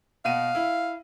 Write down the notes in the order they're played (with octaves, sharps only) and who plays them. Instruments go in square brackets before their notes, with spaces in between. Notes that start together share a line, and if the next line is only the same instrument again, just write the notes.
[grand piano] B2 F#5 D#7 [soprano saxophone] F5
[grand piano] E4